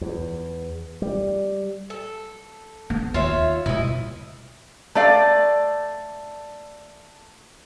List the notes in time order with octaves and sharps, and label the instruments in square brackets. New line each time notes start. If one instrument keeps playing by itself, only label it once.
[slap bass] E2
G3
[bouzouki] A4
[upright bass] B3
[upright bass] D#2 [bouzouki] F4 C#5 E5
[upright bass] B2 G3 [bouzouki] E4 D#5
[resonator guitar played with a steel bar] A3 D5 F5